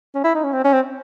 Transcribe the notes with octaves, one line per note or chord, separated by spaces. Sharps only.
C#4
E4
D#4
C#4
C4
C#4
C4